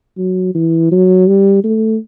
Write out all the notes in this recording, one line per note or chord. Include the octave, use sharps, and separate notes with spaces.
F#3
E3
F#3
G3
A3